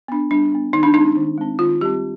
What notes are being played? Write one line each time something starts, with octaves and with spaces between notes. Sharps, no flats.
B3 D4
G3 D4
B3 D4
D#3 D#4
D4
G#3 C4 D#4
D#3
G#3 C4
D#3 F4
G3 C4 G4